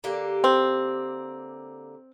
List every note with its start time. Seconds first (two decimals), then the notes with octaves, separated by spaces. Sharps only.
0.04 D3 A#3 G4
0.44 C4